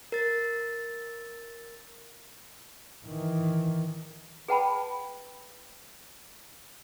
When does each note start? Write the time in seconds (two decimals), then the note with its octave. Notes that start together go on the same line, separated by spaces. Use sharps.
0.12 A#4 A6
3.06 D#3 E3
4.48 G#4 B4 F#5 G5 A5 B5